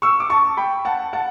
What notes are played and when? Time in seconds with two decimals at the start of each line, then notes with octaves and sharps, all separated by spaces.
0.02 C#6 E6
0.20 D6
0.30 A5 C#6
0.57 G5 B5
0.85 F#5 A5
1.13 F#5 A5